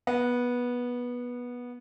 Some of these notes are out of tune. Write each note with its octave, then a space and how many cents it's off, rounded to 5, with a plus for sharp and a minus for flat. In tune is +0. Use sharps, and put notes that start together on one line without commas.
B3 -15